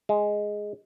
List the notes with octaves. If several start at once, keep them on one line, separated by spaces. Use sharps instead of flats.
G#3